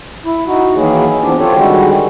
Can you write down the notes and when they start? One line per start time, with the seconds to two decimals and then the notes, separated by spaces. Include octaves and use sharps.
0.25 E4
0.47 D#4 F#4
0.75 D#3 E3 F#3 A#3 E4 G#4
1.22 E3 F3 B3 C4 D4 G4
1.39 C4 F4 G4 A4 C#5
1.55 D3 D#3 G3 G#3 F#4